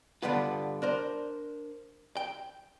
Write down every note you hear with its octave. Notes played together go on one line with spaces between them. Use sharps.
G2 D3 G3 B3 F4
D4 A#4 C5
G5